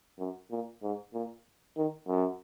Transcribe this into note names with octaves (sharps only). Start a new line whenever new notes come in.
F#2
A#2
G#2
A#2
D#3
F#2